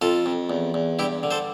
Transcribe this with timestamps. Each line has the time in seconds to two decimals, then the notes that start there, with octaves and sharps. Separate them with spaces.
0.02 F2 F4 A4
0.26 F2
0.50 E2
0.74 E2
0.99 G2 E4 G4
1.23 D3
1.31 A4 C5